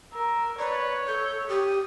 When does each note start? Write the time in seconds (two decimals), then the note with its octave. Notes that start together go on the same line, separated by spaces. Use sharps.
0.13 A#4 E6
0.59 B4 C#5 D5
1.08 A4 G6
1.49 G4 D#6